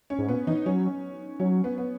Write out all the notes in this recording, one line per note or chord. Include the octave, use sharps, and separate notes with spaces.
C#4
G#2
A#2 B3
E3 D#4
F#3 C#4
F#3 C#4
B3
B3